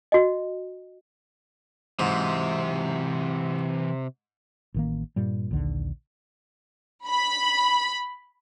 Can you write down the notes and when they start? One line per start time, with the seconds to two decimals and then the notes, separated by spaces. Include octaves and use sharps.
0.12 F#4 D#5
1.99 G#2 C3 E3 F#3
4.74 A1 D#3 A#3
5.16 G2 A#2 G3
5.51 A#1 D#2 D3
7.07 B5